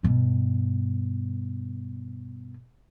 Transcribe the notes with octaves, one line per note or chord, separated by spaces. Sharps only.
G2 B2